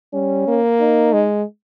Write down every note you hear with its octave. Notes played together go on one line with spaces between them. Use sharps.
G3 C#4
A#3
D#4
G#3